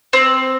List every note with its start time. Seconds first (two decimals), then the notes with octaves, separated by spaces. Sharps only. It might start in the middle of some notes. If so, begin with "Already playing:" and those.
0.13 C4